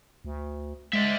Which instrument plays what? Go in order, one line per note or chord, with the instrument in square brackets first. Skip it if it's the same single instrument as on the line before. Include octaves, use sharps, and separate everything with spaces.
[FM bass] D2
[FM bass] G#3 [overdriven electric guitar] D5 E5